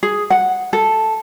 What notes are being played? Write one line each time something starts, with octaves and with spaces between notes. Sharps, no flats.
G#4
F#5
A4